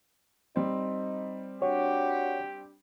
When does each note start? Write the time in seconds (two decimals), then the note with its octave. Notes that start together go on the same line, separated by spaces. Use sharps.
0.56 G3 C4 D#4
1.62 D4 F#4 G4 C#5